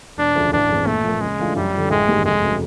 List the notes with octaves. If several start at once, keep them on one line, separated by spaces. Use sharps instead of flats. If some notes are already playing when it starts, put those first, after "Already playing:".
E1 D4
D2 C#3 F3
A1 D4
G2 E3 G#3 C4
A#2 A3
F3 A#3
C#3 G#3
E3 A3 D4 F4
F#2 G3
D3 F3
A1 G#3
G2 D#3 G3 A#3
F1 G#3
C#3 F#3 A3